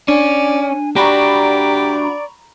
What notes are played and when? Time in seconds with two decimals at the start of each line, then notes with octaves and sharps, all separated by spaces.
0.08 C#4 D4 D5 G#5
0.96 D4 F#4 G4 D5 A#5 B5 C#6